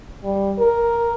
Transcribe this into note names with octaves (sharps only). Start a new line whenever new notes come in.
G3
A#4